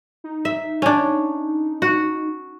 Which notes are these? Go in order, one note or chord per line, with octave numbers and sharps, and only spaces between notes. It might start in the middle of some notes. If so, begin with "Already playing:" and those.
D#4
E5
C#4 D4
F#4